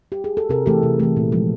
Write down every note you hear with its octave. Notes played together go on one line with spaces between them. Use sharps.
G4
G#4
A4
C3 G#4 A#4
E3 A3 G4 A4
C3
E3 A3
A#2
F3 G#3